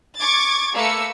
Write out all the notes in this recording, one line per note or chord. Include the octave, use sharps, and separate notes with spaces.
C#6 D6 G#6 A6
A3 A#3 B4 E6 C#7